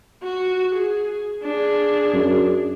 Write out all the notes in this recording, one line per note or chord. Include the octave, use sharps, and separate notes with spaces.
F#4
G#4
D4 G#4
F#2